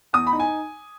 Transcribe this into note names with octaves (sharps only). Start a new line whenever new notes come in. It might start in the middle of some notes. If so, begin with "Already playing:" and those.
E2 D#6
B5
D#4
G#5